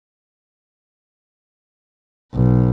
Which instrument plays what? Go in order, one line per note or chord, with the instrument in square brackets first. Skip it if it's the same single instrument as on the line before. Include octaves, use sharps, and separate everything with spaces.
[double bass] B1